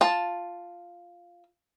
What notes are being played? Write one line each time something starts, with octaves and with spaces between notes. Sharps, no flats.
F4 A5